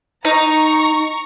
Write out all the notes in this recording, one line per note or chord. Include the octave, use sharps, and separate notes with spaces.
D#4 A#5 C#6